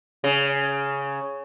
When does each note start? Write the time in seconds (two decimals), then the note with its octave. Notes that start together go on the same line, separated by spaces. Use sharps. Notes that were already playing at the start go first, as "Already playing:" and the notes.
0.24 C#3